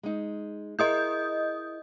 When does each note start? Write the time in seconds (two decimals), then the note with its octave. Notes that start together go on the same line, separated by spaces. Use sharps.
0.03 G#3 D#4
0.79 E4 G#4 A#4 D#5 D#6 G6